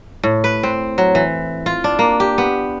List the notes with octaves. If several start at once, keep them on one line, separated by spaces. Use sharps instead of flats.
A2
B4
C4
F#3
E3
F4
D4
A#3
G4
B3